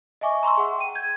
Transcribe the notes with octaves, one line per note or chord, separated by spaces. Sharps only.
D#5 E5 G#5 C#6 D6
A#5 C6 C#6 E6
G#4 F#5
G5 D#7
G6 G#6